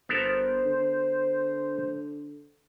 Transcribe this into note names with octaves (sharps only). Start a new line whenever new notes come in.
G1 B3 A4 A#4 C5
D3